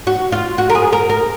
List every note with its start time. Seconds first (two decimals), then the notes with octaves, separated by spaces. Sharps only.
0.07 F#4
0.32 F4
0.58 F#4
0.70 A#4
0.75 G#4
0.93 A#4
1.10 A#4